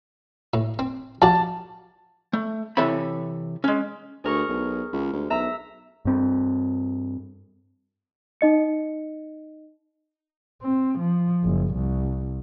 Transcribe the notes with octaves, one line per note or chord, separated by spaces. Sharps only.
A2
C4
F3 F#4 D5 A5
A3
C3 E3 A4 C#5 E5 B5
G#3 C#4
D2 G#4 A#4 C#6
B1
C#2
D2
B1 E5 A#5
G2 C4
D#4 D#5 C#7
C4
F3
F#1
C2